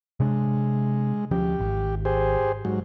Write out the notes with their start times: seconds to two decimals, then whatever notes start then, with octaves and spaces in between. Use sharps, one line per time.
0.20 C3 G#3 D4
1.31 D2 F3 C#4 G4
1.60 G#1
2.05 G4 G#4 C5
2.65 G#2 F#3